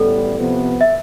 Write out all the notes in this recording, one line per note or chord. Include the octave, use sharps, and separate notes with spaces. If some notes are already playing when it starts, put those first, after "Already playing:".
Already playing: A1 A2 E3 G3 B3 A4
C3 F3 B3
E5